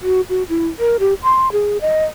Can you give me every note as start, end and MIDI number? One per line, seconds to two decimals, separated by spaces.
0.01 0.21 66
0.29 0.43 66
0.49 0.68 64
0.79 0.97 70
1.00 1.14 67
1.23 1.51 84
1.52 1.78 68
1.81 2.05 75